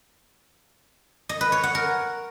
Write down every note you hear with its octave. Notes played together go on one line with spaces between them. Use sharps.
D#5
B4
C#5
F#5
A#4